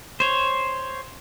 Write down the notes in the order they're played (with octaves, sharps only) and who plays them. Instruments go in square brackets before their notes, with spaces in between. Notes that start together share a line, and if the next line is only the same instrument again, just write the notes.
[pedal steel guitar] C5 C#5